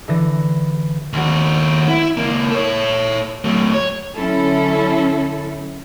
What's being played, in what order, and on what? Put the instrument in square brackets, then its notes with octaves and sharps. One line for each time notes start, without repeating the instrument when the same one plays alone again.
[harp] D3 E3 A#6
[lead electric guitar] D#2 F#4
E4
C#2 A#3
A4 C#5
F#3 A3
C#5
[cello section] D3 F#3 C#4 E4 A4